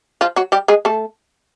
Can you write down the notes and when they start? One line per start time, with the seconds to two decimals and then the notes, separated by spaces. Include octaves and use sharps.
0.21 F3 F4
0.36 F#3 F#4
0.52 G3 G4
0.68 G#3 G#4
0.85 A3 A4